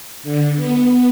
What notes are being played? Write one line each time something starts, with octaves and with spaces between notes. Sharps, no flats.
D3
B3